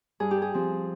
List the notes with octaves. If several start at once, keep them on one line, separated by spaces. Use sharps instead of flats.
G2 G#4
G4
G#4
F3 C4